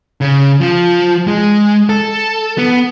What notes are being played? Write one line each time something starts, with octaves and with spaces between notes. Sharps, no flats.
C#3
F3
G#3
A4
B3